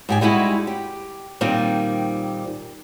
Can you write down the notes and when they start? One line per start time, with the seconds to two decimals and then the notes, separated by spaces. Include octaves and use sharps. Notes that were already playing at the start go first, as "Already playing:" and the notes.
0.09 G#2 G4 G#5
0.21 G3 G#3 D#4 E4 F#4
0.67 G4
1.41 A#2 D#3 G3 C4 D#4